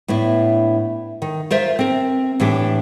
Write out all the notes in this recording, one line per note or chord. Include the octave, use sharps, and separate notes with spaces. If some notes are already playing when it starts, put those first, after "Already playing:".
A2 B3 D4 E4
D#3
F4 A#4 C5 E5
C4 A#4
A2 E3 D4 G4